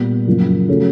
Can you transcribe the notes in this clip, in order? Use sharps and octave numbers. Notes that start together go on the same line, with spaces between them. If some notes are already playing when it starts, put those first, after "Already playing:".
Already playing: A#2 G3 B3
F#2 C#3 F3 A#3
C#3 F#3 A3 C#4